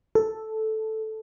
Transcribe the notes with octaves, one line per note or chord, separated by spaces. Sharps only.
A4